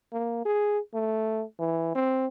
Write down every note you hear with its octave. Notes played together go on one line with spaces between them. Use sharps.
A#3
G#4
A3
E3
C4